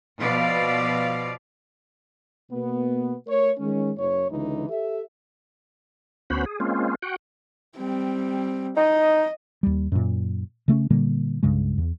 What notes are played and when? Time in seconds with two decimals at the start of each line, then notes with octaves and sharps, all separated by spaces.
0.19 B2 F3 B4 D5 F5
2.51 B2 A#3 B3
3.27 A3 A#4 C#5
3.59 D#3 G#3 C#4
3.97 F#1 C#5
4.31 C#2 D3 E3 D#4
4.69 G4 A4 E5
6.30 D2 B3 C#4 F#4 C5 B5
6.46 G#4
6.60 G#3 A#3 C4 C#4 F4
7.02 F#4 F#5 G5
7.78 G3 C4
8.77 D#4 D#5
9.63 D#2 G3
9.92 F#2 A#2
10.68 C#3 A3 C4 C#4
10.90 A#2 D3 G3 A#3
11.43 C2 G2 C#3 G#3
11.78 E2